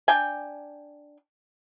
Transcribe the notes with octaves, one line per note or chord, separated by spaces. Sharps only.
D4 G5 G#5